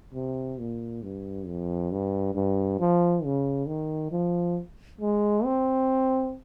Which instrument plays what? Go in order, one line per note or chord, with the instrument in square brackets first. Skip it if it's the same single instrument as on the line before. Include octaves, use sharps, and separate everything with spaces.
[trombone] C3
A#2
G2
F2
G2
G2
F3
C#3
D#3
F3
G#3
C4